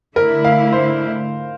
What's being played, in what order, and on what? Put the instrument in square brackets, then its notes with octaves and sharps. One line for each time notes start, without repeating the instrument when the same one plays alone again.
[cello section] D3 A3 E4 [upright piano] A#4
[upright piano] F5
C5